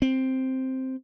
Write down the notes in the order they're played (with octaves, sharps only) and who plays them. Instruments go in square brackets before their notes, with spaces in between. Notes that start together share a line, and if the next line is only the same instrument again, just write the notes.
[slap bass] C4